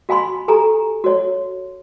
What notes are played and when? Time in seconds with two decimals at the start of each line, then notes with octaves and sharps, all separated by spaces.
0.09 F#4 F5 G#5 B5 C6
0.48 G4 A4 G#5 A#5
1.04 F#4 C#5